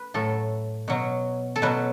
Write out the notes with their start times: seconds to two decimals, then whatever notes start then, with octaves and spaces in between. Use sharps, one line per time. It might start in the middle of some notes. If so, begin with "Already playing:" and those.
Already playing: B4
0.14 A2 F#3 A4
0.88 B2 F#3
1.56 A4
1.62 B2 F#3 B4